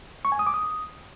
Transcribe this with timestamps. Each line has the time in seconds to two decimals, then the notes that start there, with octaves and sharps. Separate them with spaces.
0.25 C#6
0.32 G#5
0.39 D#6
0.47 D6
0.54 D#6